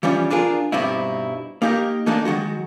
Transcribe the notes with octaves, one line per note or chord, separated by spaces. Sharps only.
E3 F3 G3 C#4 D4
D4 F4 G#4 A#4
G2 B2 G3 C4 D#4 E4
A#3 D#4 G4 G#4 A#4
E3 A3 A#3 D4 D#4
D#3 F#3 G#3 F#4